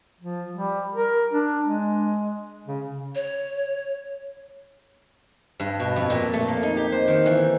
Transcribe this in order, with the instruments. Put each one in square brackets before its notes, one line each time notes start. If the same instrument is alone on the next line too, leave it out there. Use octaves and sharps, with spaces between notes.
[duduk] F3
G3
A#4
D4
G#3
C#3
[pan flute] C#5
[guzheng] G2
B2
F2
A#2
A3
A#3
D#4
G4
C5
D#3
E3